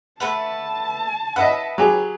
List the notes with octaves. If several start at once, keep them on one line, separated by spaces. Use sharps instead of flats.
A3 B4 F#5 A5
B4 D#5 E5 F#5
F#3 G4 G#4